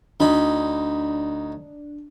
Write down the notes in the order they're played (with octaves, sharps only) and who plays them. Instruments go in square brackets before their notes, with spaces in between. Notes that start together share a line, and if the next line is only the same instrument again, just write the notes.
[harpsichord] D2 D#4 B5 [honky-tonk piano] D4